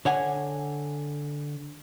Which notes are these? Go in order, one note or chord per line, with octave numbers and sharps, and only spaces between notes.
D3 C#5 F#5 G#5